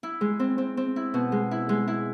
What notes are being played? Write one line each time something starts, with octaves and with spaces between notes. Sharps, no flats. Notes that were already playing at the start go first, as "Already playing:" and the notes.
E4
G#3
C4
C4
C4
E4
B2
G#3
E4
G#3
E4